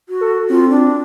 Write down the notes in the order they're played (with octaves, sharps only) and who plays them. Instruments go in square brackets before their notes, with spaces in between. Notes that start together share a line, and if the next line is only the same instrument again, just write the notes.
[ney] F#4
[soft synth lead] A4
[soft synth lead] C4 [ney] F4
[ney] D4